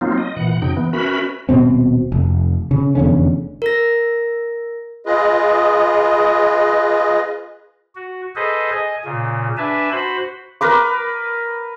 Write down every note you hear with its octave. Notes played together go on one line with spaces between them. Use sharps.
F#3 A#3 C4 D#4 F4
D#5
A#2 E3 F#5
F#2 C#3 D#4 G5
E3 B3
C#4 F#4 A#4 B4 E5 B5
D#1 B2 C4
F1
C#3
F1 E2 D3 C#4
A#4 A#6
F4 G#4 B4 D#5
F#4
G#4 A4 B4 C5 D#5
D#5 G#5
A#2 C#3
D4 B4 E5 G#5 A5
F#4 C5 B5
A#4 B4 D6